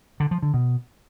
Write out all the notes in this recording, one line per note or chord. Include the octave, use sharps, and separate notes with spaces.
D3
F3
D3
B2